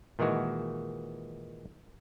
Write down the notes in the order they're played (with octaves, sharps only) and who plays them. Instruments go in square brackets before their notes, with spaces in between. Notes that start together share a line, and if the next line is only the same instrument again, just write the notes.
[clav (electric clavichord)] A#2 D#3 E3 G#3 F#4